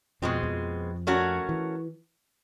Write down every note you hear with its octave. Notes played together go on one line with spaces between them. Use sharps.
F2 B2 F3 G#3 C4
F2 F3
A3 C#4 F#4 A#4
E3